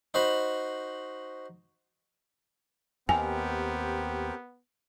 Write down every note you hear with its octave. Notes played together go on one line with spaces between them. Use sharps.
D#4 F#4 C5 B5
D#2 B3 C4 G4 A#4 G#5